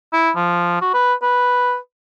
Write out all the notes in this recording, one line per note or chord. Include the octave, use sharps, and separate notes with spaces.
E4
F3
F#4
B4
B4